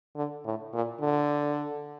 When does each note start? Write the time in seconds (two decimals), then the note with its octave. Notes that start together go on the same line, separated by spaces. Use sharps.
0.16 D3
0.45 A2
0.73 A#2
1.01 D3